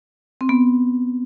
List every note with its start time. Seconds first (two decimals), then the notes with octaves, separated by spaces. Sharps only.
0.41 C4
0.49 B3